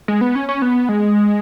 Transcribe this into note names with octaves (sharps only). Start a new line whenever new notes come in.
G#3
B3
C#4
C#4
B3
G#3